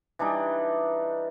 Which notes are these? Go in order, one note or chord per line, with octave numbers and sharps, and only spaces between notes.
E3 G3 D4 D#4